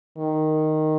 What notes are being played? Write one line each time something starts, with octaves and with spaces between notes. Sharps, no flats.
D#3